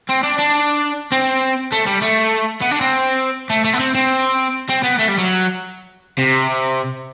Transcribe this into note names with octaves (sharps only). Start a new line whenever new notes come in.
C4
D4
D4
C4
A3
G3
A3
B3
D4
C4
A3
A3
B3
C4
C4
C4
B3
A3
G3
F#3
C3